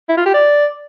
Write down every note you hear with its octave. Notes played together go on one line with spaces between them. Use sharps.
E4
F4
G4
D5